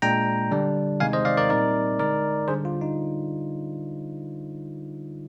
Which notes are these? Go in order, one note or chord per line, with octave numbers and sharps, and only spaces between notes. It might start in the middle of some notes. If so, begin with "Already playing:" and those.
A#2 G#3 D4 G5 A#5
D3 G3 D4
C3 D#3 G#3 D#4 F5 G#5
C5 D#5
D5 F5
A#4 D5
A#2 G3 C4 D#4 A#4 D5
D3 G#3 D#4 A#4 D5
D3 G3 D4 G#4 C5
F4
D#4